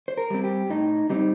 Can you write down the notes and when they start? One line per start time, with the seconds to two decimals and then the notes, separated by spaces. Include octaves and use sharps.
0.08 C5
0.17 A#4
0.30 G3 C4
0.44 G4
0.70 A2 D#4
1.10 G3 C4 D#4